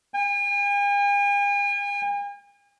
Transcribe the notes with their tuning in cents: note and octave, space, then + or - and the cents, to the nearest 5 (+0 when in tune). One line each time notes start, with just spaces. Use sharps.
G#5 -45